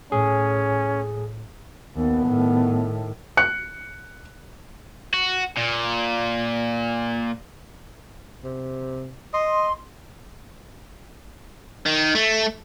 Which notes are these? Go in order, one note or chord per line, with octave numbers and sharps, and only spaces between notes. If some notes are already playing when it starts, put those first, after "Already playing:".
A2 C#4 G#4
D#2 B3
A2 D#3
F#6 C#7
F#4
A#2
C3
D#5 C6
D#3
A3